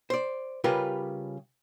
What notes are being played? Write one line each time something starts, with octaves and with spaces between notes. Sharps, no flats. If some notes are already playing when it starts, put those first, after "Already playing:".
C5 D5
C#3 G3 F4 G4 A#4 B4